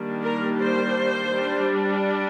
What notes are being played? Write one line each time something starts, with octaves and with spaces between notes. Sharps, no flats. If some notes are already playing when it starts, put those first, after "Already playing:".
Already playing: D#3 G3 A#3 D4
A#4
C5
G3 D4